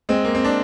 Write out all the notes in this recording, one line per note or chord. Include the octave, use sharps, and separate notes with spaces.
G#3 C4
A#3
C4
D4